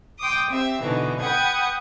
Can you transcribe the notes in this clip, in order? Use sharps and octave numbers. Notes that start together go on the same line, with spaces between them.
G5 C6 D6 D#6
C4 G4 E5
B2 D3 E3 D#4
B4 F#5 G5 D#6 G6 G#6